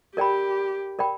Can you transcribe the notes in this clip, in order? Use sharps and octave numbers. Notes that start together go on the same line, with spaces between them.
G4 A#4 D5 G5 B5
A#4 D5 G5 B5